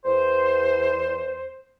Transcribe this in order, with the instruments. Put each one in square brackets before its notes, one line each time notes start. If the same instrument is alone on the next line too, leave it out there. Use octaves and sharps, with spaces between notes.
[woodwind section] E2 C5